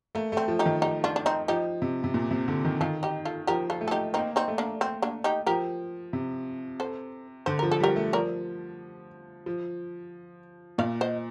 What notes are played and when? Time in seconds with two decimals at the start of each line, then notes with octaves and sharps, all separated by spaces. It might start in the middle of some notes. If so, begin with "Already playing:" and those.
0.15 A3 A#3
0.32 A3 C4
0.48 F3
0.59 D#4 G4
0.66 D#3
0.82 D#4 G4
1.04 D4 F4
1.16 D4
1.26 C4 D#4
1.48 F3 D#4 G4
1.82 C3
2.04 C3
2.14 A#2
2.31 C3
2.48 D3
2.65 D#3
2.81 D#3 F4 A4
3.03 D#4 G4
3.25 F4 A4
3.47 F3 G4 A#4
3.70 F4 A4
3.81 A3
3.88 A4
3.91 D#4 G4
4.14 A#3 C4 D#4
4.36 C4 D#4
4.48 A3
4.58 A#3 D4
4.81 C4
5.02 A#3 D4
5.24 D#4 G4
5.46 F3 G4 A#4
6.13 C3
6.80 A4 C5
7.46 D3 C5
7.59 F3 A#4
7.71 A4
7.80 G3 G4 A#4
7.96 A3
8.13 F3 A#4 D5
9.46 F3
10.78 A#2 D5 F5
11.01 C5 D#5